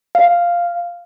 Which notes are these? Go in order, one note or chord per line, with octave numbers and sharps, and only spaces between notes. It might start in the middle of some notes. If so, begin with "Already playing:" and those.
F5